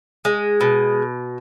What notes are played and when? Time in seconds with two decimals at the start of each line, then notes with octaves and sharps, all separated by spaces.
0.25 G#3
0.61 B2